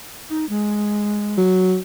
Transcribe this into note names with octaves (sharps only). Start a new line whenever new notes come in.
D#4
G#3
F#3